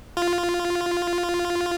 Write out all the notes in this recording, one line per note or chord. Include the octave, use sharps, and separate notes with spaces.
F4